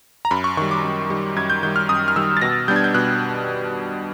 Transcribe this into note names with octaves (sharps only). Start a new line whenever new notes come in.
A#5
F#2 B5
C#6
D#3 G3 C#6
D6
F#2
D#3 G3
F#2 G#6
G6
D#3 G3 G6
F6
F#2 D#6
F6
D#3 G3 E6
A6
B2 A#6
G3 B3 D4 G6
G#6
G6
B2 F#6